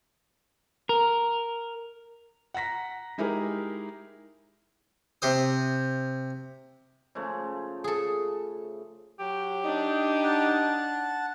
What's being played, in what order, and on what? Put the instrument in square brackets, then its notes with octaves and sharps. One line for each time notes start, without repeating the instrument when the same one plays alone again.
[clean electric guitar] A#4
[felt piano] F#5 A#5 A#6 B6
G#3 D#4 E4 G4 G#4 A#4
[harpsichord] C3 C5 D#6
[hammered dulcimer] C#3 F3 A3
[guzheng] G#4 A4
[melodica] F#3 [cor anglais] G4
[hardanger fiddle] D4 [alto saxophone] D#4
[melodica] F#5 A5